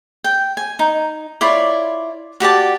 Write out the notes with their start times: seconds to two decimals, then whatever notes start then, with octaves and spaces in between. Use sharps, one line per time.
0.24 G5
0.57 G#5
0.79 D#4
1.41 E4 F4 C#5 D5
2.40 F#4 G4 D5 A5